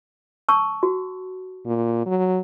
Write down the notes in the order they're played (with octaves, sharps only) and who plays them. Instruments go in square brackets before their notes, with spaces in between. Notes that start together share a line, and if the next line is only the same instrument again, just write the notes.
[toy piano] A5 C#6 E6
F#4
[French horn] A#2
F#3